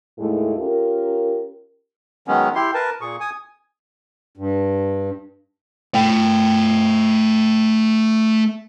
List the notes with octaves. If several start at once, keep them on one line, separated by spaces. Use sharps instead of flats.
D#2 A2 G#3 A3 G#4
C#4 F4 G4 A#4
D#3 F#3 G#3 B3 C#4
E4 G4 C6
A#4 B4 A5
A#2 G#4 C#6
G#5 D#6
G2
A3 G5